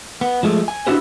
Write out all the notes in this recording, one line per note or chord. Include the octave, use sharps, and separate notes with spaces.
B3
F3 G#3 A3
G#5
B3 D4 E4 F#4 G4 C5